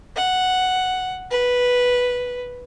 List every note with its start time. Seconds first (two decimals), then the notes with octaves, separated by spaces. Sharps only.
0.16 F#5
1.31 B4